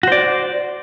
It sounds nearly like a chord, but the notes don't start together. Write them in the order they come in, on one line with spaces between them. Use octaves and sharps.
F#4 C5 D5